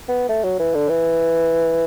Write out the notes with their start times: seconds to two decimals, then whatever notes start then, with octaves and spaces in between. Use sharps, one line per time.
0.09 B3
0.29 A3
0.44 F#3
0.59 E3
0.74 D3
0.89 E3